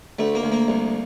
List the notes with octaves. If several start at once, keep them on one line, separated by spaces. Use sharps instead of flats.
D2 A3
A#3
D2
A#3
C2